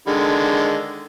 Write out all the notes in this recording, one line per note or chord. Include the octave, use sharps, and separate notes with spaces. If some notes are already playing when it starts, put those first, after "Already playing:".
D3 D#3 G#3